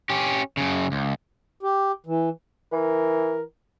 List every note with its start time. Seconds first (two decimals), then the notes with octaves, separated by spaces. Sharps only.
0.09 C#4 G4
0.57 F#2 C#3
0.92 C#2
1.63 G4
2.07 E3
2.73 E3 A#4